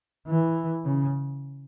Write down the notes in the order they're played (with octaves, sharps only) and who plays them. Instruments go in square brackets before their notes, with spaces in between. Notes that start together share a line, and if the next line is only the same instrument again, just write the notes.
[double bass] E3
C#3